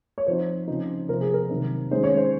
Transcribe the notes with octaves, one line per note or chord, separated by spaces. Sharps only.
C#5
F3 C4 D#4 C5
C#3 F3 C4 D#4
C3 F3 C4 A#4
G#4
A#4
C3 D#3 F#3
D#3 G#3 C#4 C5
C#5
C5